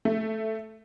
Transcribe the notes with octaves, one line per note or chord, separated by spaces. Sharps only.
A3